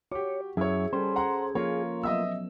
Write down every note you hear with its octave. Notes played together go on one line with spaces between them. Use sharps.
F#4 G4 C#5 D6
F#2 E4 G#4 C#5
G3 C#4 A4 C5
F#5 A#5 C6
F3 A#3 F4 C#5
F#3 B3 D#5 E5 E6